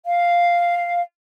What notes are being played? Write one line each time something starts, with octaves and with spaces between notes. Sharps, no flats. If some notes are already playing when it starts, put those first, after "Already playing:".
F5